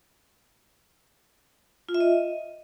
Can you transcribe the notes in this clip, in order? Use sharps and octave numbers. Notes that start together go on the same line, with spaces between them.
F4
E5
D#5